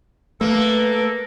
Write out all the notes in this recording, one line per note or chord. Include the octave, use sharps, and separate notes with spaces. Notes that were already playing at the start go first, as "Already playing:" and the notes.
A3 A#3 A4 B4